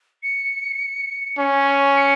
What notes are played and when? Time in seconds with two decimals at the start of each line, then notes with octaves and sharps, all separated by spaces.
0.23 C#7
1.38 C#4
1.96 C#7